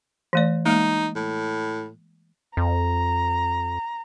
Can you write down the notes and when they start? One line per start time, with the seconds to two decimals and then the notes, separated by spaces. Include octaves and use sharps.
0.33 E3 A3 D5
0.66 G#3 A#3 D#4
1.16 A2
2.57 F2 A#5